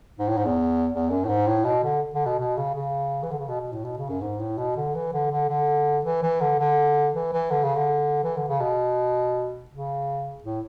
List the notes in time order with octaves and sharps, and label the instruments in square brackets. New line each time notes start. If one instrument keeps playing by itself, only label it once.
[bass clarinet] G#2
A2
G#2
E2
E2
F#2
A2
G#2
A2
B2
D3
D3
B2
B2
C#3
C#3
E3
D3
C#3
B2
B2
A2
B2
C#3
F#2
G#2
A2
B2
D3
E3
D3
D3
D3
E3
E3
D3
D3
E3
E3
D3
C#3
D3
E3
D3
C#3
B2
C#3
A2